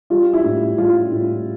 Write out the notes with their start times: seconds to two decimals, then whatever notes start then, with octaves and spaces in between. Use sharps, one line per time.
0.10 G3 F4
0.33 E4
0.44 A2
0.78 G3 F4
1.12 A2